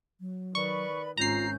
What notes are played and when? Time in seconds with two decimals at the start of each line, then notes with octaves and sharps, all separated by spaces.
0.20 F#3
0.55 D#3 B4 D5 B5 C#6
1.17 G#1 C#4 F4 A#5 G6 C7